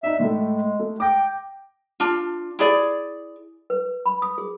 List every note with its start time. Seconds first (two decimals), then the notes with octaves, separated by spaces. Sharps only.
0.03 D4 D#4 E5
0.20 A2 G#3 A3
0.79 A3
1.00 G5 D6 A#6
2.00 D4 F4
2.59 E4 G#4 D5
3.70 B4
4.06 B5
4.22 D#6
4.38 G#4